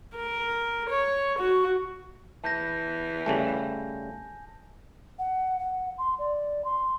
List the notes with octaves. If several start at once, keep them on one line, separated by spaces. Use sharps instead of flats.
A#4
C#5
F#4
E3 A5 G6 A#6
C#3 G3 A3 G#5
F#5
F#5
C6
D5
C6